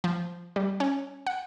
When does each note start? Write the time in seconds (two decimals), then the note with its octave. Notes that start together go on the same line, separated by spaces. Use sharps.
0.04 F3
0.56 G3
0.80 C#4
1.27 F#5